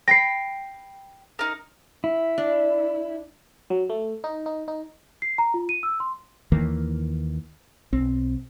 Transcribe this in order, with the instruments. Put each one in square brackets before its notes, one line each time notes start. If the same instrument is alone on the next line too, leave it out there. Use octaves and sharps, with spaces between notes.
[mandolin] G5 B5 [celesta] A#6 C7
[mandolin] D#4 A#4
[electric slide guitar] E4
[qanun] D4
[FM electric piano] F#3
A3
D#4
D#4
D#4
[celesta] C7
A#5
F4
D#7
E6
C6
[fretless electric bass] D#2 D#3 E3 A#3
B1 C4